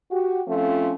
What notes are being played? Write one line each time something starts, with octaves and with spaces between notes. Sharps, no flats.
F#4 G4
F3 A3 C4 C#4 F4 A4